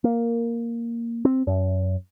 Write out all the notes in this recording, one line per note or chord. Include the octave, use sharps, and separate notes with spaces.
A#3
C4
F#2